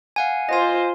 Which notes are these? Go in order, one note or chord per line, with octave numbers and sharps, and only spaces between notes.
F5 F#5 G#5
F4 C5 D#5 G#5